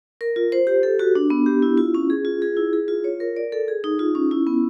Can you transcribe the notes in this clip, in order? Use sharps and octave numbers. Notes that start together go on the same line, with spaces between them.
A#4
F4
C5
G4
A4
F#4
D4
B3
G4
E4
F4
C#4
G#4
F4
G#4
E4
G#4
F4
C#5
A#4
D5
A4
G#4
D#4
F4
C#4
E4
B3